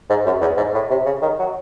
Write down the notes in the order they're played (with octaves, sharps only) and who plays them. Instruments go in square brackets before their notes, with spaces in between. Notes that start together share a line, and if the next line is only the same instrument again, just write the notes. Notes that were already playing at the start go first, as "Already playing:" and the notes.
[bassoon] G#2
F#2
E2
G#2
A2
C3
C#3
D#3
F#3